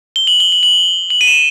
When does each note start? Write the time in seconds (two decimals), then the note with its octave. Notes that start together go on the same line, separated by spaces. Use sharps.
0.16 G7
0.27 F#7
0.40 G7
0.52 F#7
0.63 F#7
1.10 F#7
1.21 D#7
1.27 E7